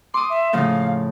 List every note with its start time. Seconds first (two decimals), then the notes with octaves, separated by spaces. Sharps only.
0.14 C6 D6 D#6
0.30 E5
0.53 A2 C#3 F3 F5